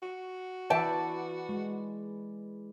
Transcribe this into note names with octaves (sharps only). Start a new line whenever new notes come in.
F#4
E3 B4 D5 E5 G5 A5
G#3